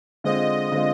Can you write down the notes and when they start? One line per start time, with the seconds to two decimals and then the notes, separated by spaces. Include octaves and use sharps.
0.24 D3 G#3 C4 F4 D#5
0.72 D3 G#3 C4 F4